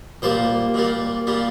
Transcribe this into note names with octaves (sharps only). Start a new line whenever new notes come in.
A#2 G3 A#3 C5
A#2 G3 A#3
A#2 G3 A#3